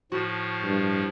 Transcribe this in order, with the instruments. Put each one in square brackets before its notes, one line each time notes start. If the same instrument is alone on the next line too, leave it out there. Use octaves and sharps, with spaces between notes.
[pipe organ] A2 F3 [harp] F#4
[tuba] G2